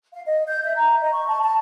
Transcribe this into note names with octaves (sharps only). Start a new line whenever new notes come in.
F5
D#5
G6
E5
A#5
D#5
C#6
A5
A5